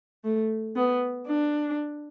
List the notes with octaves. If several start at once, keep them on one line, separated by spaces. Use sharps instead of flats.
A3
B3
D4